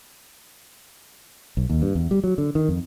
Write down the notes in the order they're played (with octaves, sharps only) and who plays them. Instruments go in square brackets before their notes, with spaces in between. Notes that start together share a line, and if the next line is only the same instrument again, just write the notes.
[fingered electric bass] B1
D#2
G2
E2
G3
F#3
D3
D#3
F2